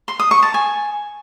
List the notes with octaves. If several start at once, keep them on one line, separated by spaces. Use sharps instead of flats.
C6
D#6
C#6
A5
G#5